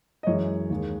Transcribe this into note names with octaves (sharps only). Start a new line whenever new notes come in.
D#5
F#2 E3 G#3 C#5
D#2 D#3 G#3